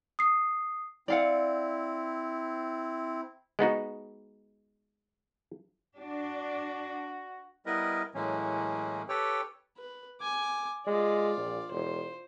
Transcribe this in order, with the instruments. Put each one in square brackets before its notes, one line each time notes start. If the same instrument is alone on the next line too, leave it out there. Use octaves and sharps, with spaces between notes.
[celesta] D#6 C7
[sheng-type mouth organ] C4 E4 [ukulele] D5 F5 F#5
[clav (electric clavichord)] G#3 B3 D#4 F#4
[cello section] D4 [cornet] F#4
[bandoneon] G3 B3 E4 A#4 B4 D#5
A2 E3 F#3 G#3 A#3 C#4
G4 A4 B4 C#5 G5
[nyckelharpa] B4
G#5 D6
[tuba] G#3 [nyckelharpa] F4 D5
[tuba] A#1
[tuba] E1 [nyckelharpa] C5